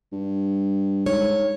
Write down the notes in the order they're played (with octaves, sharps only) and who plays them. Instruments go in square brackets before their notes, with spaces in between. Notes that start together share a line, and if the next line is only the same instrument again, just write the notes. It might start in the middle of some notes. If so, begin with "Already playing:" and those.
[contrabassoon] G2
[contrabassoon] G#2 [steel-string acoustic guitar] C#5